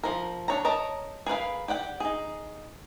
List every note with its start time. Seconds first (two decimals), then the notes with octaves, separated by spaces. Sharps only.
0.03 F3 A#4
0.48 D4 C#5 A#5
0.65 A#4 C#5 D#5 A5 A#5
1.26 G#4 A#4 B4 F5
1.68 G4 D5 F#5 G5
2.00 D#4 G#4